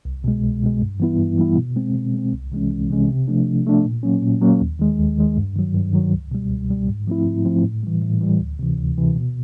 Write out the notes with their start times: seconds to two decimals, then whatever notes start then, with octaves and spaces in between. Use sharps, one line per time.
0.05 C2
0.24 B2 G#3
0.43 C2
0.63 B2 G#3
0.81 G2
1.00 E3 G3 B3 E4
1.19 G2
1.38 E3 G3 B3 E4
1.57 B2
1.76 G#3 C4
1.95 B2
2.14 G#3 C4
2.33 C2
2.52 C3 E3 G#3 C#4
2.71 C2
2.90 C3 E3 G#3 C#4
3.08 C3
3.28 F3 A3 D4
3.46 C3
3.66 F3 A3 D4
3.84 A#2
4.03 F#3 A#3 C#4
4.23 A#2
4.42 F#3 A#3 C#4
4.60 D#2
4.79 D#3 G#3
4.99 D#2
5.18 D#3 G#3
5.37 G2
5.56 D#3 F#3
5.75 G2
5.93 D#3 F#3
6.13 C#2
6.31 B2 G3
6.50 C#2
6.70 B2 G3
6.88 G#2
7.07 F3 A3 C4 E4
7.26 G#2
7.45 F3 A3 C4 E4
7.64 A2
7.83 E3 G3
8.02 A2
8.21 E3 G3
8.40 D2
8.59 C3 E3
8.78 D2
8.98 C3 E3
9.16 B2